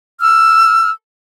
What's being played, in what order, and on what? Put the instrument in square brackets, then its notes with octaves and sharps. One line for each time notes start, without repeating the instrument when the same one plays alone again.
[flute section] E6 F6